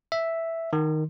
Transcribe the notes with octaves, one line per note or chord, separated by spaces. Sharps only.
E5
D#3